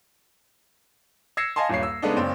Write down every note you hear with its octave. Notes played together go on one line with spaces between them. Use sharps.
E6 G#6 A#6 C7 C#7 E7
D#5 F5 G#5 A5 C6
D#1 G2 C#5 C7
E6
C#3 G#3 A3 B3 D4 D#4
F#1 C4 D5